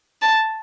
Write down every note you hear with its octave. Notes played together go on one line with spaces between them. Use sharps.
A5